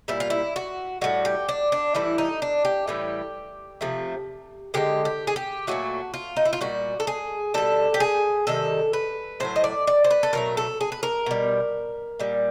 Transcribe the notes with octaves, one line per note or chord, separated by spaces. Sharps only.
A#2 G3 E4
F4
E4
F#4
A2 E3 G3 F#4
G4
D4
D4
A2 E3 G3 E4
D#4
D4
G4
A2 E3 G3 G4
C3 F3 A3
D3 F3 G#3 G4
G4
G#4
G4
A#2 F#3 A3 F#4
F4
D#4
E4
F4
A#2 G3 F#4
A4
G#4
B2 G3 A4
G4
G#4
C3 D#3 G3 A4
B4
A2 F#3 A3 C5
D#5
D5
D5
C5
B4
A4
B2 F#3 A3 A#4
A4
G#4
B4
A#4
B2 G3
A#2 G3